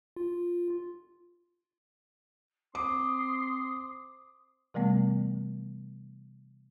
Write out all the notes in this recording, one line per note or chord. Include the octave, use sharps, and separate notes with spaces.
F4
C4 C6 D6 D#6
C3 E3 G3 A3 B3